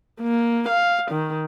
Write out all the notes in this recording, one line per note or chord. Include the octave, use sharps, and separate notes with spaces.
A#3
F5
D#3